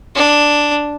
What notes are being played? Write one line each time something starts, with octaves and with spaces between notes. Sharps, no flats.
D4